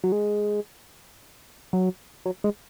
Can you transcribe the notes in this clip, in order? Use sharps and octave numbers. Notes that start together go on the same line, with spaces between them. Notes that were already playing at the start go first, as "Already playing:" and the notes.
F#3
G#3
F#3
F#3
G#3